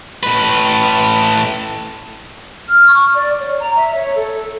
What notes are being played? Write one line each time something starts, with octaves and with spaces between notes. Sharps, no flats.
A2 B4
F6
C#6
D5
C#5
A#5
E5
C#5
A4